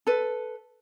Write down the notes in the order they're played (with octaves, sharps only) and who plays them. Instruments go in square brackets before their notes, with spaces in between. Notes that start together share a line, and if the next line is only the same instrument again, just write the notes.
[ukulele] A4 B4